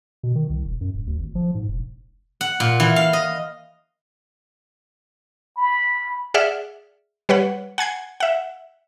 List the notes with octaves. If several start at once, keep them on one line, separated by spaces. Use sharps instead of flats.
B2
D#3
C2
E1
F#2
D1
D2
G#1
F3
G#2
E1
F#5
A#2
E3
F5
D#5
B5
G#4 D5 E5 F#5 F6
G3 B4 C#5 F#5
F#5 G#5 G#6 C7
E5 F#5